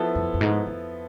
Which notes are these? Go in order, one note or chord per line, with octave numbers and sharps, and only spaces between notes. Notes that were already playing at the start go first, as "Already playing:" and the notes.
Already playing: F3 B3 E4 A4
F2
F2
G#2
F2